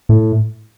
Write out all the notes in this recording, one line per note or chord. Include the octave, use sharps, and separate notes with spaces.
A2